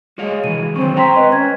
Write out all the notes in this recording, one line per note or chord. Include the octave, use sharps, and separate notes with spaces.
G#3 F#4 C#5 F5
C3 E3 D#7
D3 D#3 F#3 C4 C#6
G#3 C4 G5 A#5 C6 B6
B4 D#5
C#4 G#6